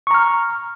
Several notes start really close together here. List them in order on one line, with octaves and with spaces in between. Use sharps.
C#6 A#5 F6